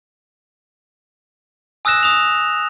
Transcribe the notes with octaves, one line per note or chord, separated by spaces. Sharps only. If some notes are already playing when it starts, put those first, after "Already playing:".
G#5 D#6 E6 F#6 A#6 E7
D#6 E7 F7